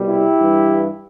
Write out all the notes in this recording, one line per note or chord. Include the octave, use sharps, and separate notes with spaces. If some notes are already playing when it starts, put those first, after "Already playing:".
Already playing: C2 B2 G3
E4 G4
G2 E3 G3